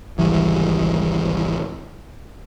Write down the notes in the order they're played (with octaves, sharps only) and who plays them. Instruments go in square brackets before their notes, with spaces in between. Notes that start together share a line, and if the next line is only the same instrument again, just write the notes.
[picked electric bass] G#1 C#2 E3 G3